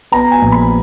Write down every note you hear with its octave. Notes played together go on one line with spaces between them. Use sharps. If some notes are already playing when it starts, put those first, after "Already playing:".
B3 A#5
G#5
A#1
B5